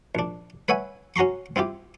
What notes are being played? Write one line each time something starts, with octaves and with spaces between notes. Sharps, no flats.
A#1 D4
B4 C#5 E5 F#5 G#5
C#4 F#4 A#5 C6 C#6
C4 E4 F4 G4